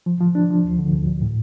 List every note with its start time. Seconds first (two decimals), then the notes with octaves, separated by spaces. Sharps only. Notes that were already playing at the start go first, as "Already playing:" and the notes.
0.06 F3
0.21 F3
0.35 D4
0.50 F3
0.64 D2
0.79 D3
0.92 D2
1.07 D2
1.21 A2